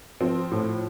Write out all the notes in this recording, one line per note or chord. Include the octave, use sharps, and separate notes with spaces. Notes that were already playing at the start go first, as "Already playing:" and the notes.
F3 C4
A2